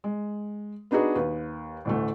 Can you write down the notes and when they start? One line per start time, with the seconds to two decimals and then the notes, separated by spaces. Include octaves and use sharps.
0.04 G#3
0.91 B3 D4 D#4 F#4 G#4 B4
1.15 D#2 B4
1.85 A1 D2 A3